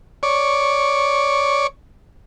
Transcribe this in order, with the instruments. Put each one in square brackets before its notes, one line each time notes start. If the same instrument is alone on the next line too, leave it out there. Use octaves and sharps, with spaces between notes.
[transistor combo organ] C#5 D5